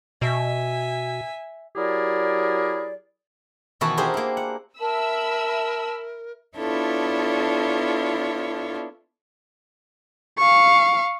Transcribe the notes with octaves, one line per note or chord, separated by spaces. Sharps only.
B2 E5 G#5
F#3 E4 G4 G#4 A#4 D5
B2 D#3 E3 F#4 B4 A5
D4 D#4 G4 G#4 A#4 C5
A#3 E4
F#5
A#4 E5 A5 B5 E6
B3 D4 E4 F4 A4 C#5
F5 C#6